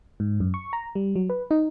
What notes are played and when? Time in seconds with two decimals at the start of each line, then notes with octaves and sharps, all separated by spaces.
0.20 G#2
0.40 F#2
0.54 C#6
0.73 A#5
0.95 G3
1.16 F#3
1.30 B4
1.51 D#4